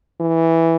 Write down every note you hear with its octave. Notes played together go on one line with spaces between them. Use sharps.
E3